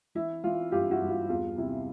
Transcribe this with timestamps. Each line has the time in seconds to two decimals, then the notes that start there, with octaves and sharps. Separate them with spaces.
0.15 E3 E4
0.44 E3 F4
0.72 G2 F4 G4
0.91 E4 F#4
1.01 G2
1.10 F4
1.29 E2 F4
1.58 C3 E4